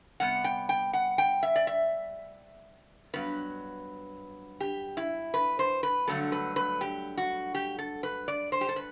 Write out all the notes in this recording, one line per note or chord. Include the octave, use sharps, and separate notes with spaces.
C3 G3 B3 F#5
G5
G5
F#5
G5
E5
D5
E5
G2 F#3 B3 B4
G4
E4
B4
C5
B4
G2 D3 F#3 A3 A4
B4
B4
G4
F#4
G4
A4
B4
D5
C5
G4
A4
B4